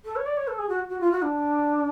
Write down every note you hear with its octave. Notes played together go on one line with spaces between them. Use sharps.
A4
C#5
D5
C#5
A4
G#4
F#4
F#4
F4
F#4
D4